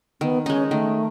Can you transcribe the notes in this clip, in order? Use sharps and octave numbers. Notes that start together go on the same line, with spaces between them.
D#3 B3
G#3 C#4 D#4
D#3 A3